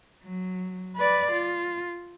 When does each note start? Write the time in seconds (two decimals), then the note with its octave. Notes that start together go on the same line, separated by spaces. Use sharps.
0.24 F#3
0.96 B4 D5
1.31 F4